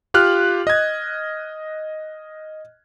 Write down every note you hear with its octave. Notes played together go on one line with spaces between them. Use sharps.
F4 G4 F6 F#6
D#5 G#6